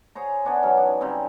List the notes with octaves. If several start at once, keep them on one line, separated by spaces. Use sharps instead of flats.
G#4 C5 C#5 A#5
B3 D4 C#5 G#5
E3 F#3 C#4 D#4
D4
C#3 G3 C4 D#4